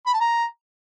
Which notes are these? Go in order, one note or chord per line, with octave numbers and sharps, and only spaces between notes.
B5
A5
A#5